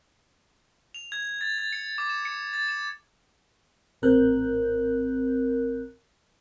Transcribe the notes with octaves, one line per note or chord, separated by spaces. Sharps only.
F7
G#6
A6
A6
C#7
D6
E7
C#7
A6
E7
A#1 A2 C4 A#4 F#6 G6